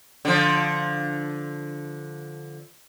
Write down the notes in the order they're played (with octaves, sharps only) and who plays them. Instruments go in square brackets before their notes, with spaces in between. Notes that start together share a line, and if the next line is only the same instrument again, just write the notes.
[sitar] D3 F3